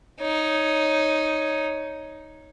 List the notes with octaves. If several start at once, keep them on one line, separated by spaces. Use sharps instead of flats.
D#4 C#5